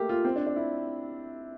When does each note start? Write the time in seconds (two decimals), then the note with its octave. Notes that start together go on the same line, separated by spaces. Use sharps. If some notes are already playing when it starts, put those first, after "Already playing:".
Already playing: A3 A#3 G4
0.09 F4
0.24 C4
0.36 D4
0.46 D4
0.56 E4